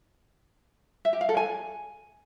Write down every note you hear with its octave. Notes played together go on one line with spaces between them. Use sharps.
E5
G4
F5
A4
G#5